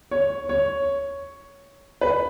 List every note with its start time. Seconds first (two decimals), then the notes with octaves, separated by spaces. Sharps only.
0.11 C#5
0.49 C#5
2.01 B4